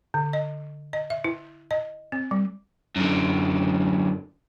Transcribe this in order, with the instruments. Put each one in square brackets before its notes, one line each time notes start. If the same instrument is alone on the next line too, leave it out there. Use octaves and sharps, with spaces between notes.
[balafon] D3
D#5
D#5
E5
E4
D#5
C4
G3
[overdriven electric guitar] F#2 D3